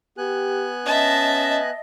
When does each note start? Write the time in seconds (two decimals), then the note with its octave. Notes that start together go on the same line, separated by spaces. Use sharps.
0.18 B3 G4 G#5 F#6
0.86 C#4 D#5 E5 A5